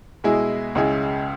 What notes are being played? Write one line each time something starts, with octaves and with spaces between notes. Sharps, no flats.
B2 G#3 E4 G#4
C#2 C#3 G#3 E4 G#4